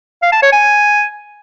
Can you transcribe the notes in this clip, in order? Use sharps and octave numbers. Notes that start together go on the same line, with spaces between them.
F5
A5
C#5
G#5